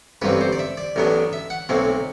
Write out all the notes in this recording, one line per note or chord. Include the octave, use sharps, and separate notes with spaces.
A1 G2 F#3 C4 B4
C5
D5
E5
D5
A1 A2 F#3 B3 D4
E5
F#5
B1 A2 F#3 C4